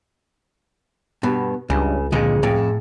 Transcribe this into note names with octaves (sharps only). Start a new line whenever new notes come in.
G2 B2 B3
C#2 G2 C#3
F2 A#2 D3 G#3 G#4
F2 A2